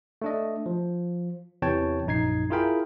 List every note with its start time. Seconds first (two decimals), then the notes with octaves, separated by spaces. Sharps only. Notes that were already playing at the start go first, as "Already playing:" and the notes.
0.22 A3 D4 D#5
0.66 F3
1.62 E2 C3 E3 C#5 G5 A5
2.06 A#1 F#2 D#4 G#6 C7
2.50 E4 F4 G#4 A#4 G5 B5